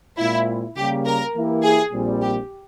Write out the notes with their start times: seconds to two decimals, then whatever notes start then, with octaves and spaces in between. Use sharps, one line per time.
0.18 A#2 G#3 C4 E4 F4
0.76 C#3 G3 A#3 G4
1.05 A#4
1.35 E3 A#3 E4 G4
1.63 G#4
1.92 A#1 A#2 G3 C4
2.22 G4